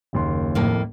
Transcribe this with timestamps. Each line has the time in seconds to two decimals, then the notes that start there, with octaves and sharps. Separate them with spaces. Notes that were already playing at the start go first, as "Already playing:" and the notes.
0.13 F#1 D#2 C6
0.55 F2 A2 A#3